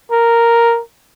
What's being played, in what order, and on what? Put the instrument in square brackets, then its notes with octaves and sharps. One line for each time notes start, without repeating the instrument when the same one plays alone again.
[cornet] A#4